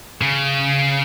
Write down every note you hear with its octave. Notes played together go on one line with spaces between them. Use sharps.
C#3